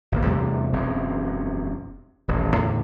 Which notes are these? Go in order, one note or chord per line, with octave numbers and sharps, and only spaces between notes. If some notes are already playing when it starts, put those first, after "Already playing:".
G#1 D2 A#3
E2 C3 G3 A3
E1 F#2 B2 C4
D#1 A1
E2 A2 D3